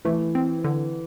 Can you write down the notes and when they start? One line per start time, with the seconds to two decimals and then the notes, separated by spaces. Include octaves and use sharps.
0.05 E3 A3
0.35 C4
0.64 D3